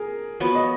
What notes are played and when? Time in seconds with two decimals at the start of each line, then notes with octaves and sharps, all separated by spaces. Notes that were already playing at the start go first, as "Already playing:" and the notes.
Already playing: G#4 A#4
0.40 F3 B3 F#4 C#5
0.55 D#5